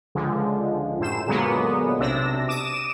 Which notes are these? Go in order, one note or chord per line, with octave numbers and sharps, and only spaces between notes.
C#2 D3 F3 G#3
F#2 A2 C5 E6 E7
A#2 D3 F#3 G#3 A#3 B3
B1 C3 D4 E6 A#6
D6 D#6 E7